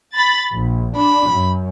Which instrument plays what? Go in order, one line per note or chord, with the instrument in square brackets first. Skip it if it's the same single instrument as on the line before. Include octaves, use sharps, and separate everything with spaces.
[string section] B5 A6
A#1
[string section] D4 [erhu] B5
[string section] F#2